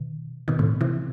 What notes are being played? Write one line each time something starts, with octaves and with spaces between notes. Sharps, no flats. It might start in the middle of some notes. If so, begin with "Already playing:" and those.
Already playing: B2 D#3
B2 D#3
A2 C3
C3 E3